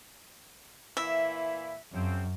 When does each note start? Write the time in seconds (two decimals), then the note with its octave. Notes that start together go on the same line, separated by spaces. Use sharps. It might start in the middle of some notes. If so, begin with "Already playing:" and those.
0.97 A#2 E3 E4 E5
1.93 F#2 C#3 F3 C4